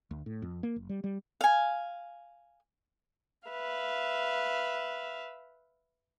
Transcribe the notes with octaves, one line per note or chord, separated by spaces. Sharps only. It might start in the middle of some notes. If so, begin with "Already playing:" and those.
D2
A2
F2
A#3
F#1
G3
G3
F5 G#5
B4 E5 F5